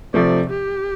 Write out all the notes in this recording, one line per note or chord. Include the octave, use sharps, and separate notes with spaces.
C3 F3 A3 D5
G4